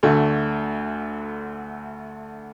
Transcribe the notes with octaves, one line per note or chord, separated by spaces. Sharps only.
D2 D3 A3